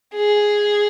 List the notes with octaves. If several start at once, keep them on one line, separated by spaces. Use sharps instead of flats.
G#4